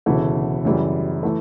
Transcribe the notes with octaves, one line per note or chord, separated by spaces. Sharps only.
E1 D2 C#3 E3 A3
F#2 C#3 E3 G3
E3 A3